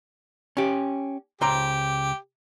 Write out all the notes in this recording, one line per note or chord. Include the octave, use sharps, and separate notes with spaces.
C#4 G4
C#2 G4 C5 A#5